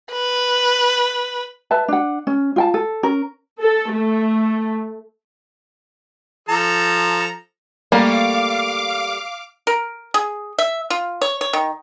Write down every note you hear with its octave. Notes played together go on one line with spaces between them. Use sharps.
B4
B4 E5 A5
D4 F#5
C#4
F4 G5 A5
A4
C#4 A#4
A4
A3
F3 A4 A#5
G3 A3 A#3 F5 D6
A#4
G#4
E5
F4
C#5
C#5
D#3